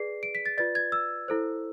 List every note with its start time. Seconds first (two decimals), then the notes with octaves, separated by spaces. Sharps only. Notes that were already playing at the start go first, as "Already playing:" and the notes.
Already playing: G#4 B4 D5 C7
0.23 D7
0.35 B6
0.46 A6
0.58 F4 B4 D5 A6
0.75 G#6
0.92 E6
1.28 E4 A4 C5